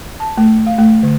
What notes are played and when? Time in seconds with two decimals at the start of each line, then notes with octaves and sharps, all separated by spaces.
0.20 A5
0.37 A3
0.67 F5
0.78 A3
1.03 D3